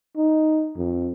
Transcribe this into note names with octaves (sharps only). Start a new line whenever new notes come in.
D#4
F2